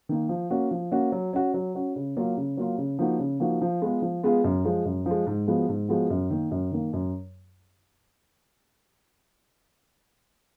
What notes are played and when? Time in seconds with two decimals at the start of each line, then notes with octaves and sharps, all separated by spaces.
0.09 D#3 A#3
0.29 F3
0.50 A#3 C#4 F#4
0.71 F3
0.92 A#3 C#4 F#4
1.12 F#3
1.33 C#4 F#4
1.54 F#3
1.75 C#4 F#4
1.96 C#3
2.17 F#3 A#3 F4
2.37 C#3
2.57 F#3 A#3 F4
2.78 C#3
2.99 F3 A#3 D#4 F#4
3.19 C#3
3.40 F3 A#3 D#4 F#4
3.61 F3
3.82 G#3 B3 F4 G#4
4.02 F3
4.23 G#3 B3 F4 G#4
4.44 F#2
4.65 F3 G#3
4.85 F#2
5.06 F3 G#3
5.27 G#2
5.47 F3 G#3 B3 F#4
5.69 G#2
5.89 F3 G#3 B3 F#4
6.10 F#2
6.30 D#3 A#3
6.51 F#2
6.72 D#3 A#3
6.93 F#2